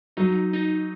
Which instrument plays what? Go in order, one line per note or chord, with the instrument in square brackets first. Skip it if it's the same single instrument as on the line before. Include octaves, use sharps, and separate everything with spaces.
[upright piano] F#3 [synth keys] D#4
[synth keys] D#4